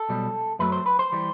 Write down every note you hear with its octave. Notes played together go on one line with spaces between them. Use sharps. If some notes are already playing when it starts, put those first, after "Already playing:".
Already playing: A4
B1 B2 G3
F#2 F#3 A3 B4
C5
B4
C5
E3 G3